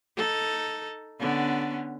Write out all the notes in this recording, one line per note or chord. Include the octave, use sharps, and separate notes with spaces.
D#4 A4
D3 B3 C#4